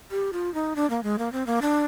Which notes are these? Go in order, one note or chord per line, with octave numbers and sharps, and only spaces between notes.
G4
F4
D#4
D4
A#3
G#3
A#3
C4
A#3
D4